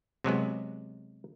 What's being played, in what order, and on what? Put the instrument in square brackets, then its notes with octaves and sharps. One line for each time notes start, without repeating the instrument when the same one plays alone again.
[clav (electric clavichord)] C3 F#3 G#3 B3